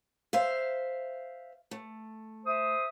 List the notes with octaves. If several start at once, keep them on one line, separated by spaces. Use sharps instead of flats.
C5 E5 F5
A3
C5 E5 D#6